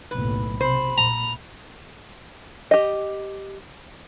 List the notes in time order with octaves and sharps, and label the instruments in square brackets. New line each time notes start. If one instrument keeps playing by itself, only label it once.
[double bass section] F#1 B1 A2 [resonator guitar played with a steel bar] B4
[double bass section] C3 [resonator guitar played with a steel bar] C5 [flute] B5
[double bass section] A#2 [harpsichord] A#5
[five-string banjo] G4 D#5